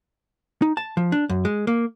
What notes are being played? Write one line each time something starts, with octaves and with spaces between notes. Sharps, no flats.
D#4
A5
F3
D4
F#2
G#3
A#3